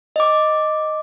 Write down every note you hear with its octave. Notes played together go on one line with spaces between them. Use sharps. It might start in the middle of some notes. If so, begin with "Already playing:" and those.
D#5 D6